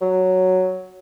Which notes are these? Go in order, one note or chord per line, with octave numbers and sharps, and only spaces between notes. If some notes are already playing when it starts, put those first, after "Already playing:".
F#3